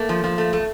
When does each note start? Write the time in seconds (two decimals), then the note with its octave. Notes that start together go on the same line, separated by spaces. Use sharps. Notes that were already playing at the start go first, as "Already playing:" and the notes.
Already playing: A3 A#3
0.09 F3
0.24 F3
0.38 A3
0.53 A3